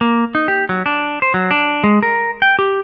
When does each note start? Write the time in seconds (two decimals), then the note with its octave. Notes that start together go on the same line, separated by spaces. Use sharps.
0.01 A#3
0.35 D#4
0.48 G4
0.69 F#3
0.86 D4
1.22 C5
1.34 F#3
1.51 D4
1.84 G#3
2.03 A#4
2.42 G5
2.59 G4